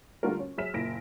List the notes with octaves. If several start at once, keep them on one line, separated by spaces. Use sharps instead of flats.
D3 G3 A3 F4 F#4 A#4
C#4
F#3 G#4 E5 F6 B6 E7
F#1 A#2 E4 A#6 D7